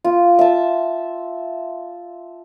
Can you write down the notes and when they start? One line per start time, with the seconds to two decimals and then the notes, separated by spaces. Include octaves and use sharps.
0.04 F4
0.39 E5 A5